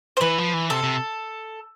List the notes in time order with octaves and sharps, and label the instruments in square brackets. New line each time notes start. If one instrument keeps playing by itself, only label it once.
[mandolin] C5
[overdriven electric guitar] E3 [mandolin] B4
[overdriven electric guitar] F3
E3
[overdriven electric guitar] C3 [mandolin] A4
[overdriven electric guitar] C3